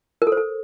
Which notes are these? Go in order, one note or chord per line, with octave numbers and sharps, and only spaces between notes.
A#4
A4
C5
A4